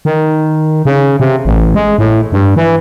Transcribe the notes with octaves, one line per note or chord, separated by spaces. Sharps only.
D#3
C#3
C3
A1
G#3
A2
G2
E3